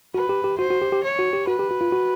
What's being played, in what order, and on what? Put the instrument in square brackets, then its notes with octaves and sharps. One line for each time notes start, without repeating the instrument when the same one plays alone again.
[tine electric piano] F#4 [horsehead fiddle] B4
[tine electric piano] G4
G4
[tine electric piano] F#4 [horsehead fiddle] C5
[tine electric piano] F#4
G4
G4
[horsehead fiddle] C#5
[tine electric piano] F#4
G4
[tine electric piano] F#4 [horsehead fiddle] B4
[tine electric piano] G4
F#4
F4
F#4